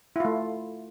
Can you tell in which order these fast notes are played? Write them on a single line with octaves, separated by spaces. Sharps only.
E4 F4 A3